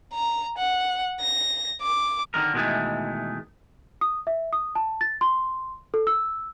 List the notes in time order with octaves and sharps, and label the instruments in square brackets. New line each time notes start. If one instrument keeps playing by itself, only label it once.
[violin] A#5
F#5
A#6
D6
[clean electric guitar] D3 D#3 G#3 A#4
B2 D#3 E3 G#3 A3
[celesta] D#6
E5
D#6
A5
A6
C6
A4
E6